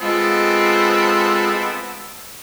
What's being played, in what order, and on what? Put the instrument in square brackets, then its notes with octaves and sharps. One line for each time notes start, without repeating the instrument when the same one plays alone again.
[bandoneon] G#3 F4 [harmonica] B3 C4 A4